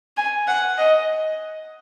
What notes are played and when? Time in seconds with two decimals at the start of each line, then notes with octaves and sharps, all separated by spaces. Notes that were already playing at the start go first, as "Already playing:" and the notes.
0.17 G#5
0.48 F#5
0.78 D#5